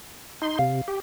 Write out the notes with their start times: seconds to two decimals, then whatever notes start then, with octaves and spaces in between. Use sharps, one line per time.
0.42 D#4 C6
0.59 C3 F5
0.88 G4